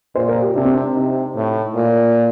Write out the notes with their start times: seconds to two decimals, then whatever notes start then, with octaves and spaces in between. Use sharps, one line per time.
0.15 A#2 C5
0.29 A#4
0.41 G4
0.55 C3 D4
0.65 C4
0.75 D4
0.95 C3 D#4
1.35 A2
1.75 A#2